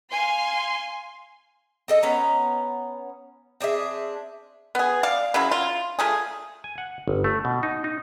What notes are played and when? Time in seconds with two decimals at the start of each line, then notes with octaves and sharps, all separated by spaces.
0.12 F5 G#5 C6
1.88 C4 A4 D#5
2.03 B3 C#4 A#5
3.60 C4 D4 G#4 E5
4.75 B3 G#4
5.03 D5 F5
5.34 C#3 F#3 E4
5.51 F4
5.99 F3 A3 G#4
6.64 G#5
6.78 F#5
7.08 G1
7.24 A3
7.45 B2
7.63 D#4
7.84 D#4